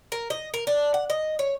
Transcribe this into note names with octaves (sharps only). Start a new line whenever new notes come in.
A#4
D#5
A#4
D4
F#5
D#5
C#5